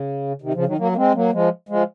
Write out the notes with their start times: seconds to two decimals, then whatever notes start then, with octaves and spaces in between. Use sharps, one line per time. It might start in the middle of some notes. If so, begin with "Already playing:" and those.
Already playing: C#3
0.42 C3 D#3
0.54 C#3 F3
0.66 D#3 F#3
0.78 F#3 A#3
0.92 A#3
0.96 G#3 C4
1.14 F#3 A#3
1.33 F3 G#3
1.69 F3 G#3